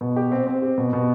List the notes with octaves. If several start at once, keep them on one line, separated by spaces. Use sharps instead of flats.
B2
G4
C4
C4
G4
B2
B2